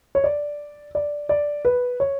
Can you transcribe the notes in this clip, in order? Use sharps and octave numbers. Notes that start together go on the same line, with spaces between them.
C#5
D5
D5
D5
B4
C#5